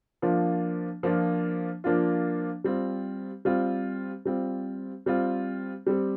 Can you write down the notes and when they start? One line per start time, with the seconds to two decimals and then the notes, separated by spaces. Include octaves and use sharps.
0.22 F3 A#3 D4 F4
1.03 F3 A#3 D4 F4
1.84 F3 A#3 D4 F4
2.64 G3 C4 F4
3.45 G3 C4 F4
4.25 G3 C4 F4
5.06 G3 C4 F4
5.86 G3 C4 G4